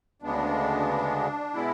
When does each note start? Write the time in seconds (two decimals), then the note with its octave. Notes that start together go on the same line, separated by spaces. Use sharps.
0.22 D2 C#3 G#3 B3 D4
1.54 B2 G#3 B3 E4